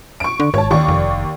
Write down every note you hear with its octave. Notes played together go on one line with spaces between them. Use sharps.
C#6 D7
D3
G#1 C#5 A5
D#2 D5 C#6
F1